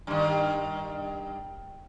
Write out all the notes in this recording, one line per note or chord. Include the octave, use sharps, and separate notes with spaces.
G2 D#3